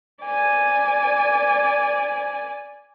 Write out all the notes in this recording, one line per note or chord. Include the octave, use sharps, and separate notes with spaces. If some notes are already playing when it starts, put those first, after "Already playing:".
D5 G#5